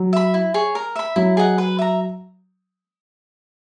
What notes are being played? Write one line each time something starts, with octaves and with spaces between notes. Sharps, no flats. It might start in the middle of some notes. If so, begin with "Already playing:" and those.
Already playing: F#3
E5 B5
E4
G#4 C#5
A#4
E5 B5
F#3 E4
G#4 D#5 F#5
B4
E5 A#5